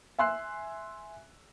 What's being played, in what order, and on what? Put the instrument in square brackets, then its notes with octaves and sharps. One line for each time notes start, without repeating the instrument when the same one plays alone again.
[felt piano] E5 G#5 C6 E6 F#6 C7